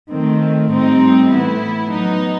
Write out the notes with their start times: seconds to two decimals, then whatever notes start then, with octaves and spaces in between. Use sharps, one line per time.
0.11 D#3 A3 C4
0.71 A2 G3 C4 D#4
1.30 A2 E3 B3 E4
1.90 F#3 B3 D#4